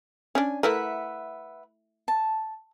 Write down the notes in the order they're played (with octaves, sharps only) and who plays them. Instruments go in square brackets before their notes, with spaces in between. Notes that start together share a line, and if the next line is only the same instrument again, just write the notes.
[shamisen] C#4 D4 [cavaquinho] G#5
[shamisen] A3 E4 A#4 [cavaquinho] B4 E5 F#5
[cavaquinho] A5